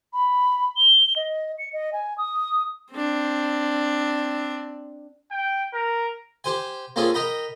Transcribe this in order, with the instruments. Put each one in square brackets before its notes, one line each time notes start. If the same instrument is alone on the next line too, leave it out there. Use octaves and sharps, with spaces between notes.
[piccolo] B5
G7
D#5
C#7
D#5
G#5
D#6
[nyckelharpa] C4 D4
[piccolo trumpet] G5
A#4
[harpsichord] G4 C5 G#5
A#3 C4 C#4 F4 G#4 A4
A#4 D#5 G5 A#5 B5